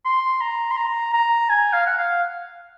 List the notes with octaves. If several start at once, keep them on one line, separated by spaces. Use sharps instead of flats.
C6
A#5
C6
A#5
A#5
G#5
F5
F#5
F5